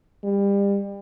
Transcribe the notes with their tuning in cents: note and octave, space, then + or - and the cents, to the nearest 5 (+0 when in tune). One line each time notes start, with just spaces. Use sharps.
G3 +30